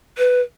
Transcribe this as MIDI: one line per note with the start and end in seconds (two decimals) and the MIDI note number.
0.18 0.41 71